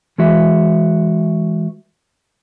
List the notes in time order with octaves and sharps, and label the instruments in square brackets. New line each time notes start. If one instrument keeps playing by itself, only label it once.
[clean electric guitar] E3 G#3 F#4 E5